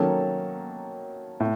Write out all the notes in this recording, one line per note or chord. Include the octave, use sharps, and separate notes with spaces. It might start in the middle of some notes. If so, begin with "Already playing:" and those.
Already playing: D#3 F#3 A#3 C#4 A4
A2